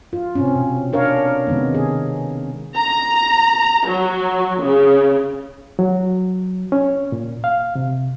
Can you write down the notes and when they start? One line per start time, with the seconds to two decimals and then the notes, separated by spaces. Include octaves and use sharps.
0.13 F4
0.35 C3 C4 C#4
0.55 B2
0.93 D4 A#4 C#5 F5
1.47 C3 D#3 G#3 B3
1.75 G#4
2.76 A#5
3.86 F#3
4.63 C#3
5.79 F#3
6.72 C#4
7.12 A#2
7.44 F5
7.75 C3